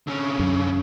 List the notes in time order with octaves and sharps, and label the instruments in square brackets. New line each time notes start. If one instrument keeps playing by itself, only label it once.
[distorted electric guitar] D3 C#4
[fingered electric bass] F#2